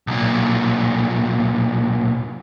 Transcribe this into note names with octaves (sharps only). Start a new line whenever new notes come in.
B1 A#2